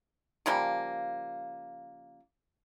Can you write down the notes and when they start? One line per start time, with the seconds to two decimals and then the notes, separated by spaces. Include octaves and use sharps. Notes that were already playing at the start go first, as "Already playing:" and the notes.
0.46 C#3 F3 G3 A#3